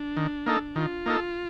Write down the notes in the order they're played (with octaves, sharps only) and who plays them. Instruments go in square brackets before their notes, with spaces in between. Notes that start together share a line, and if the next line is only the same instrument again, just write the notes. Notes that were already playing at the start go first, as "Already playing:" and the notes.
Already playing: [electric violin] D4
[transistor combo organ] D#3
A#3 D#4 A4
[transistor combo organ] D#3 [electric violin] F4
[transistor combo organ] A#3 D#4 A4